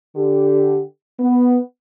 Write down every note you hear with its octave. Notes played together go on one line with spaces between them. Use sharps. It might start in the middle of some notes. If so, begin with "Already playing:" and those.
D3 G4
B3